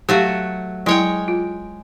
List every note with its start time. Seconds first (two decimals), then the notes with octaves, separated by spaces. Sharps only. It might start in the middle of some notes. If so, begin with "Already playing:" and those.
0.09 F#3 A3 F#4 G4 F5
0.86 F#3 G#3 E4 C#5 G5
1.28 F4